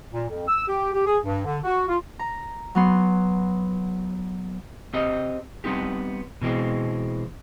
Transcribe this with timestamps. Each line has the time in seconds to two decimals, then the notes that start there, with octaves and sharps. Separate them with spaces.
0.12 A#2
0.28 F2
0.47 E6
0.67 G4
0.93 G4
1.06 G#4
1.24 G2
1.45 D3
1.64 F#4
1.87 F4
2.19 A#5
2.75 F#3 B3 C6
4.94 C4 G4 D#5
5.64 G3 B3 C4 D#4 G4
6.42 B2 E3 G#3 C4